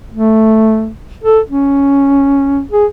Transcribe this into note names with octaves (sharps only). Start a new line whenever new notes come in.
A3
A4
C#4
G#4